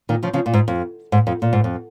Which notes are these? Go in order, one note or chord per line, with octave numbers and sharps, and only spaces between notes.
A#2 D#3
C#3 F3
C#3 F3
A#2
G#2
F2
G#2
F2
A#2
G#2
F2